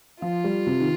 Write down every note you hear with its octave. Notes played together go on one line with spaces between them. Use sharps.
F3 F4
G3
C3
D#3